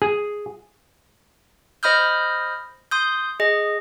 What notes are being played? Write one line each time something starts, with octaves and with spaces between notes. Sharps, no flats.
G#4
C5 D#5 B5 D#6 F6 G6
C6 D#6 G6
G#4 D#5